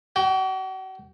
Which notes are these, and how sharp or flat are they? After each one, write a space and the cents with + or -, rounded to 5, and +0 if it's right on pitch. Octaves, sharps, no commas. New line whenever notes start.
F#4 +40 G5 +0